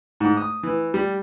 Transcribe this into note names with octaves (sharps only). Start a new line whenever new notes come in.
G#2
D#6
E3
G3